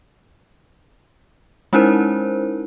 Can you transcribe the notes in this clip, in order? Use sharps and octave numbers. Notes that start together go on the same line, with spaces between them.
G#3 C#4 D#4 E4 A#4 C5